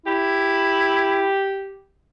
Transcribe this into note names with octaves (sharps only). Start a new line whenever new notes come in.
E4 G4